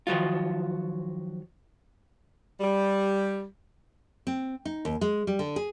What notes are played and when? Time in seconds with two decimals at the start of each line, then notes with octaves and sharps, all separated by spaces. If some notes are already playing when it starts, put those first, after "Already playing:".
0.07 D#3 F3 F#3 F4
2.60 G3
4.27 C4
4.65 D#4
4.85 D#2
5.01 G#3
5.27 G3
5.39 D3
5.56 G#4